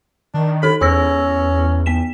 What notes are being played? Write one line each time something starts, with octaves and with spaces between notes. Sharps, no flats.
D#3 D4
D#4 A4 B5
E2 C#4 G#4 E6 A#6
B3 B6 E7